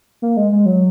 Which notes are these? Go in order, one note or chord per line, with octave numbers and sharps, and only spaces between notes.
A#3
G#3
G#3
F#3